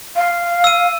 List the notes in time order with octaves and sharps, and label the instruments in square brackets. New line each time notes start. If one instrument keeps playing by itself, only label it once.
[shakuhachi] F5
[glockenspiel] E6 D#7